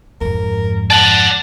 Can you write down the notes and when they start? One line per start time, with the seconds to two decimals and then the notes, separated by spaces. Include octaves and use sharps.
0.21 F2 G#2 A#4
0.91 D5 F#5 A5